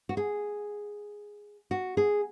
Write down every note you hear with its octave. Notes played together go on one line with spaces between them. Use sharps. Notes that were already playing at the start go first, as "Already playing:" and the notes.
F#4
G#4
F#4
G#4